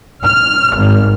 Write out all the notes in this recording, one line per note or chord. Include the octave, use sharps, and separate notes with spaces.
F6
G#1